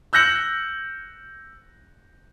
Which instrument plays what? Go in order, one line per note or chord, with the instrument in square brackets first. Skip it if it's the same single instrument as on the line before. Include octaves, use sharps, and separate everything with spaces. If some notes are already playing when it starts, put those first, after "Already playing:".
[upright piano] E6 F#6 G6 A#6 C#7 F#7